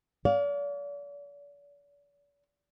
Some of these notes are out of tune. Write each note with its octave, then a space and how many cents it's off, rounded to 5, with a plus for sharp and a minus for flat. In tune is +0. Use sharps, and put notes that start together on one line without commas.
D5 -40 F5 +20